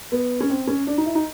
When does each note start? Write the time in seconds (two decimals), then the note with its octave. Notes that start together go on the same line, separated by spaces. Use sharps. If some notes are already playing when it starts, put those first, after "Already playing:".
0.12 B3
0.41 C#4
0.50 C4
0.67 C#4
0.87 D4
0.98 D#4
1.06 E4
1.15 D#4